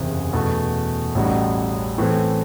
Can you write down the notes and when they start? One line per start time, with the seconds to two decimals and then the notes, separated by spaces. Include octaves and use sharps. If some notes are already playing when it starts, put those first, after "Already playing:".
Already playing: F#1 E2 C3
0.33 E2 B2 A3 E4
1.15 A1 A2 G3 D#4 F#4
1.98 A2 E3 A3 C4